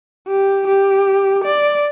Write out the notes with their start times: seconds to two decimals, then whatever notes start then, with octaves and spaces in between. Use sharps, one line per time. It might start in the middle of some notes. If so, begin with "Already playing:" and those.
0.27 G4
0.67 G4
1.44 D5